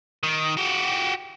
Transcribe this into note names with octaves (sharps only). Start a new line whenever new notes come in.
D#3
F#4 G4